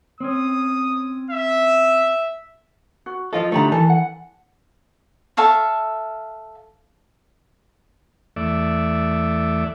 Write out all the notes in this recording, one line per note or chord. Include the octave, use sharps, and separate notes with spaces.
C4 C#4 D#6
E5
F#4
F3 F4 A4 D#5
D3 G3 A3 D#4 A#5
E3 A4
F#5
A4 E5 F5 C#6
E2 A3 D5 E5